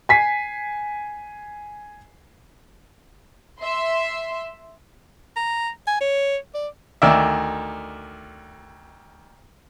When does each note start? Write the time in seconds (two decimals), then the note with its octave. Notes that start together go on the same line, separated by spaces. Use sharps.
0.09 G#5 B6 C7
3.60 E5 C6
5.36 A#5
5.87 G#5
6.01 C#5
6.55 D5
7.02 D2 D#3 D5 E5